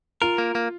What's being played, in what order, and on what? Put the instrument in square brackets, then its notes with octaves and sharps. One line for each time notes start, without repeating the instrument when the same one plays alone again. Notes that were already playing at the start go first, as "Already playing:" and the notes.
[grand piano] F4 [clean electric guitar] A#4
[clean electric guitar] A#3
A#3